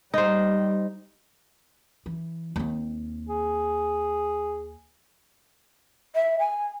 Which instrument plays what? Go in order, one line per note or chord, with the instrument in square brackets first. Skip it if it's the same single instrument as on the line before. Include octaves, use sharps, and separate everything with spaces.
[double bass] G3 [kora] D#4 C5
[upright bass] E3
D#2 C4
[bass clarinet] G#4
[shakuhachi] E5
G#5